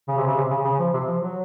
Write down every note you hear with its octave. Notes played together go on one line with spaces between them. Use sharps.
C#3
C3
C#3
C3
C#3
C#3
F3
C3
F3
F#3